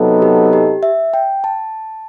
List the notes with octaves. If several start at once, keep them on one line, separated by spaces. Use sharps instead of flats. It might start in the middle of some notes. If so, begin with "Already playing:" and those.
Already playing: C3 F#3 B3 D#4 A4
G4
G4
E5
G5
A5